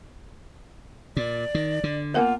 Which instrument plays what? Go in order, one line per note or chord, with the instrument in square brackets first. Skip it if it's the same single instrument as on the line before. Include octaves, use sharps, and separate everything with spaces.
[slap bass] A#2 [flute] D5
[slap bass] D#3
D3
[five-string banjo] A#3 F#5 [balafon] B3 A#4 G#5 [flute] F4